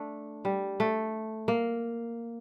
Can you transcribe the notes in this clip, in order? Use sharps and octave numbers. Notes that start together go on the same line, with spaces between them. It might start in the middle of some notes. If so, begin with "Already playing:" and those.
Already playing: A3 D4
G3
A3
A#3